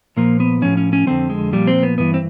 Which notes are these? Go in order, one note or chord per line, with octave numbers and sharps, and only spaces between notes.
A#2 F3 A#3
B3
A2 F3 C#4
C#4
C#4
F2 D3 F3 C4
G#3
A#2 F3 G3
C4
B3
G2 E3 B3
C4